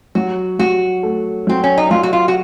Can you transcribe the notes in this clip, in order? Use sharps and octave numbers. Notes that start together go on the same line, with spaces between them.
F#3 F#4
F#3 F#4
A3
F#3 C4
C#4
D#4
F#3 F4
F#4
F4
F#4